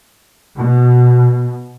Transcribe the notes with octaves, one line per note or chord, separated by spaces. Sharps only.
B2